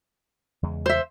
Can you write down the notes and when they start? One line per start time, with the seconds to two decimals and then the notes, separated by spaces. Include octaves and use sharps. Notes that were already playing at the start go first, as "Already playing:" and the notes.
0.63 E2 C#3 G#3
0.86 C5 E5